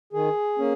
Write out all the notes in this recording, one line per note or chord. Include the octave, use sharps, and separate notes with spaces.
D#3 G#4
A#3 C#4